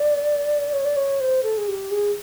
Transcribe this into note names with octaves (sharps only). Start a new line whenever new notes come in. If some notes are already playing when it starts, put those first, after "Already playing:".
Already playing: D5
C#5
D5
C#5
C5
A4
G#4
G4
G#4